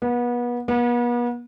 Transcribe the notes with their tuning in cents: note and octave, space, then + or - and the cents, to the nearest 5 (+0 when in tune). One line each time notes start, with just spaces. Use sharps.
B3 -30
B3 -40